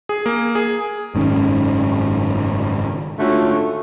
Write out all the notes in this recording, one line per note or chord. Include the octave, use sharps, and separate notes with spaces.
G#4
A#3
G#4
F#1 G#2 D#3 C#4
G#2 D3 A3 C#4 F4 F#4